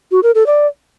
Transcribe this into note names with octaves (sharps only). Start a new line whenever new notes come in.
F#4
A#4
A4
D5